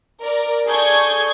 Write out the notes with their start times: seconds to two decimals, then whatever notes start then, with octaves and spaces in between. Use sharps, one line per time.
0.22 A#4 D5
0.67 G#4 A4 D5 C#6 G6 G#6